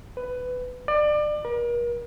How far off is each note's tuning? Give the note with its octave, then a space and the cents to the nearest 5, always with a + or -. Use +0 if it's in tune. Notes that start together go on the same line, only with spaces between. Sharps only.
B4 +15
D5 +30
A#4 +40